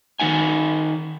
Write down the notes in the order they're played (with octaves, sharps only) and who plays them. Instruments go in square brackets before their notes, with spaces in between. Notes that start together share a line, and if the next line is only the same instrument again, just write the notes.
[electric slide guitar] D#3 A#3 D#4 F#5 G#5